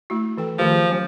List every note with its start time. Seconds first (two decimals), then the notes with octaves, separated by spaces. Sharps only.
0.10 A3 E4 F#4
0.37 E3 A4 G5
0.58 D#3 F3 A3 G4
0.72 G#4
0.90 F#3 C#4